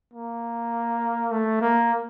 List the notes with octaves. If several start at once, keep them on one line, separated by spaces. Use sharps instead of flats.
A#3
A3
A#3